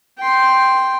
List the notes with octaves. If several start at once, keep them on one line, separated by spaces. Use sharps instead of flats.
G5 C6